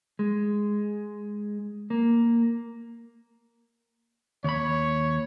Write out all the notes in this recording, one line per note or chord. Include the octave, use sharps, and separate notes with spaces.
G#3
A#3
D#2 C#5 B5